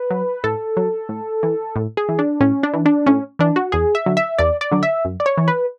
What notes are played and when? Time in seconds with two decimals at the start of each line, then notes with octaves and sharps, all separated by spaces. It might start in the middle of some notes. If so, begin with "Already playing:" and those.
Already playing: B4
0.11 F#3
0.44 A2 A4
0.77 F#3
1.09 A2
1.43 E3
1.76 A2
1.97 G#4
2.09 E3
2.19 D4
2.41 A2 C#4
2.63 D4
2.73 E3
2.86 D4
3.07 A2 C#4
3.39 E3 D4
3.56 F#4
3.72 E2 G#4
3.95 E5
4.06 D3 F#3
4.17 E5
4.39 E2 D5
4.61 D5
4.71 D3 F#3
4.83 E5
5.05 F#2
5.20 D5
5.26 C#5
5.37 E3
5.48 B4